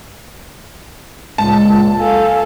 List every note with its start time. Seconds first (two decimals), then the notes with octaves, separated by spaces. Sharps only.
1.38 C#2 A#2 G#3 A5
1.99 A4 F5 G#5